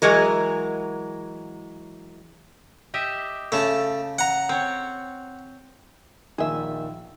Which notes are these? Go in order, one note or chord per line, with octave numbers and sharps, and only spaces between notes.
E3 F#3 G#3 A#4
G4 D#5 E5
C#3 A3 A5
F#5 A#5
C4 C#5
A#1 D#3 G#4 E5